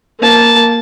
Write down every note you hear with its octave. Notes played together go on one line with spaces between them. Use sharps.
A#3 A5